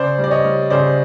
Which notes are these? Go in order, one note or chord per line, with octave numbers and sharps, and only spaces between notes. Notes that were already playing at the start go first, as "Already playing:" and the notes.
Already playing: C#3 C5 D5
G3
D5
C#5 D#5
G3
C#3 C5 D5